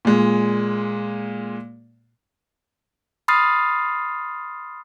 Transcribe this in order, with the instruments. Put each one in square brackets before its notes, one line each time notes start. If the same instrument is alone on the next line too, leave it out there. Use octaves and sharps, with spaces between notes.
[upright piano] A#2 G#3
[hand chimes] B5 C6 D#6 F6 A6 C7